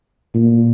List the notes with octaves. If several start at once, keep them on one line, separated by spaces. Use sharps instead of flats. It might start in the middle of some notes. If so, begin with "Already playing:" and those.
A#2